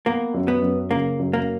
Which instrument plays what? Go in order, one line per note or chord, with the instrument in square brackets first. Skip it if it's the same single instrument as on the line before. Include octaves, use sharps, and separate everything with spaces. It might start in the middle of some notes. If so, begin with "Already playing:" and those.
[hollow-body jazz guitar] A#3 [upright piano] B3
[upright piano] F#2
[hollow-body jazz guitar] B3
[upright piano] F#2
[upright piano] C#3 [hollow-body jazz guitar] A#3
[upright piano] F#2
[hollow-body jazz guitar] A#3